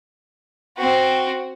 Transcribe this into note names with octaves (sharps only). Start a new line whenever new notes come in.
C4 F#4